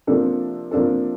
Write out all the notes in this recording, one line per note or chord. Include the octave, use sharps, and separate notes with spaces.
C3 F3 A#3 D4 A4
C3 F3 A#3 D4 A4